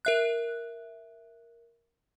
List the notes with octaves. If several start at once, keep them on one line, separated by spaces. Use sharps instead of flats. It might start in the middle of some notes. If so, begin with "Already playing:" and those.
A#4 E5 F#6